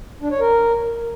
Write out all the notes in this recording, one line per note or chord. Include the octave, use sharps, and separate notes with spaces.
D4
C#5
A#4